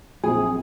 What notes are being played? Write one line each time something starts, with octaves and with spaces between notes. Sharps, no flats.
A#1 A#2 F#3 C4 G#4